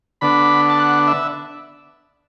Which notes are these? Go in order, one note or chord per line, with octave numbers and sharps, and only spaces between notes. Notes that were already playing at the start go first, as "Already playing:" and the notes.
D3 B3 D4 B5
A5
F#5
E5